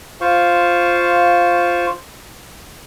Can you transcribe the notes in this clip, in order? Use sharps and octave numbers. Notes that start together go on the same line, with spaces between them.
F4 C5 F5 C#6